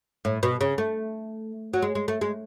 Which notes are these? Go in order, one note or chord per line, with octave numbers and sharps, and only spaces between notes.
A2
B2
C#3
A3
F#3
G#3
G#3
A3
G#3